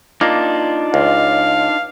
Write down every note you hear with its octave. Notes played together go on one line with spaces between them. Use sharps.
A#3 D4 D#4 F4
C#2 F5